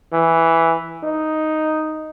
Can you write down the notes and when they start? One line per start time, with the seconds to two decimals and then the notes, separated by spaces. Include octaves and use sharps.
0.12 E3
1.03 D#4